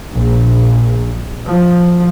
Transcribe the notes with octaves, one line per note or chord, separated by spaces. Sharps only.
A#1
F3